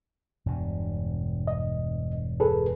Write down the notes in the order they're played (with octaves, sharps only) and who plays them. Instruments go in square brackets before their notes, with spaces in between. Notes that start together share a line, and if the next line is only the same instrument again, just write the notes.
[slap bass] E1 G2 B2
[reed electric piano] D#5
G#4 A4 B4